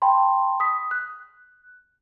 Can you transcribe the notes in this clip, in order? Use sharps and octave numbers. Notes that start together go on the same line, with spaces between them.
G5 A5 B5 C6
D#6 B6
F#6